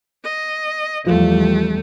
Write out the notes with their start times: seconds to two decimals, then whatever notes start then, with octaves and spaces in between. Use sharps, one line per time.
0.24 D#5
1.06 E2 F3 G3 A3